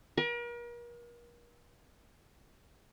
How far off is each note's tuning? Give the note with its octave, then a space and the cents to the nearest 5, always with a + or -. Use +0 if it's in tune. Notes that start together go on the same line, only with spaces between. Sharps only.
A#4 +40